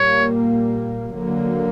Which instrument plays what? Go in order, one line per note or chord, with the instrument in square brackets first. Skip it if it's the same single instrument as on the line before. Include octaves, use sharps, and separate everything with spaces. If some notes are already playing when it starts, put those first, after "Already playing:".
Already playing: [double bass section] A#2 G3 A#3 [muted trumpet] C#5
[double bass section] D3 F#3 A#3